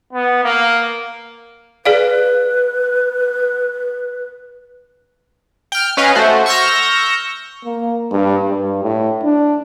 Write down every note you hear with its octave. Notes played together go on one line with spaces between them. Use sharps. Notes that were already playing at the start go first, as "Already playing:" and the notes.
B3
A#3
G#4 B4 D5 F5
G5 F6
C#4 B4 D#5 F5
A3 F#4 C5
C#6 E6 F6 G6 A#6
A#3
G2
G2
A2
D4